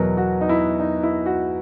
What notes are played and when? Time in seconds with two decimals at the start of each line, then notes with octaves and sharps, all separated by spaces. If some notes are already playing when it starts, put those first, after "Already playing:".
Already playing: E2 B2 F#3 A#4
0.17 F#4
0.41 D#4
0.49 E4
0.80 D#4
1.03 E4
1.26 F#4